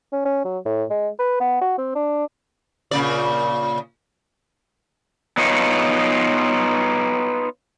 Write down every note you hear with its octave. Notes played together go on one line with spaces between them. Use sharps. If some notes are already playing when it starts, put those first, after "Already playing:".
C#4
C#4
F#3
A2
G#3
B4
B3
F#4
C4
D4
A#2 C#3 D5
B3 D#4 F4 C#5